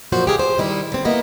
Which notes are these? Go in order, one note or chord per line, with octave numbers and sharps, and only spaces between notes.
F#2 A#2 F3 F#4 C5
G4 G#4 A#4 F5
C5
D#3 G3 E4
D3 C4
A#3 B3 E4 D#5